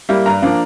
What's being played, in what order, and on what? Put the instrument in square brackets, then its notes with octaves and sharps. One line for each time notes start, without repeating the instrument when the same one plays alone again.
[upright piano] G3 A#3 E4
G2 A#5
F3 A#3 D4